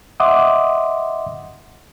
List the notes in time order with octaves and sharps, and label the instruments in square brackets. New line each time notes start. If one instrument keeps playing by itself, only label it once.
[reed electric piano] D#5 E5 F#5 C6 D6 D#6